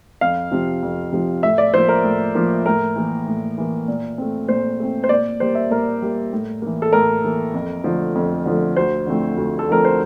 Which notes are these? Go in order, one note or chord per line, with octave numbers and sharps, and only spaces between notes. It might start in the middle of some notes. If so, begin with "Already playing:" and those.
F2 F5
C3 F3
F2
C3 F3
A2 E5
D5
F3 A#3 C5
A#4
A2
F3 A#3
A2 A#4
E3 A#3
A2
E3 A#3
A#2
A3 C4
A#2 C5
A3 C4
C5
A#2 D5
G3 A#3 C5
E5
A#2 A#4
G3 A#3
A2
E3 A#3
A4
A2 A#4
E3 A#3
F2
D3 F3 A3
F2
D3 F3 A3
D2 C5
D3 F3 A3 C4
D2
A4
D3 F3 A3 C4 A#4
C5